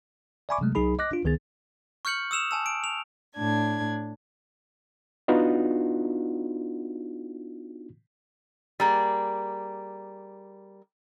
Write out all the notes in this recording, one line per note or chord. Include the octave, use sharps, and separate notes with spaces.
D5 E5 G#5 B5 C#6 D6
C3 F#3 G#3 A3
C2 F#3 D#4 G#4 B5
D#5 D6 F#6 A#6
D4 F4
C#2 D#3 B3 G#4 A6
C#6 F6 G6 C#7 F#7
D#6 E6 E7 F7
G#5 A5 E6
D7
F7
A2 D4 G#6
B3 D4 D#4 F4 F#4
G3 A#3 G#4